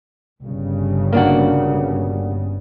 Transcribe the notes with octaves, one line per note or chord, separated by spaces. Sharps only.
G1 G2 C#3
A#3 D4 F#4